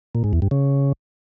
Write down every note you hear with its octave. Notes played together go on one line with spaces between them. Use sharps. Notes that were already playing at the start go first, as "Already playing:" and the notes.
A#2
G#2
E2
G2
C#3